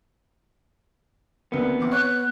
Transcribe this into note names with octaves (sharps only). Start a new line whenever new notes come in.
D2 C3 A#3 B3
E2 C4 D6
C#5 F#6